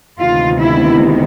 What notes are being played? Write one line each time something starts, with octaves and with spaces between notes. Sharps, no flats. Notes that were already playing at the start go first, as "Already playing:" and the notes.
D2 C3 D#3 G#3 B3 F4
E4